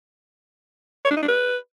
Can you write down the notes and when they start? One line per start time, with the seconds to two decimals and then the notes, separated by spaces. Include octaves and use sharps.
1.05 C#5
1.11 D4
1.17 D#4
1.22 D4
1.28 B4